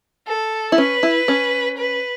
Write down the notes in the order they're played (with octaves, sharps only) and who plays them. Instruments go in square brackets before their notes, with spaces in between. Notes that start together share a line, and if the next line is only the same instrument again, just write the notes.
[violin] A4
[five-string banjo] E4
[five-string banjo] C#4 [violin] B4
[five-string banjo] E4
C#4
[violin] B4